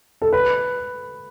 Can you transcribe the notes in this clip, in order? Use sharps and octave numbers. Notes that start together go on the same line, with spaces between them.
A4
B4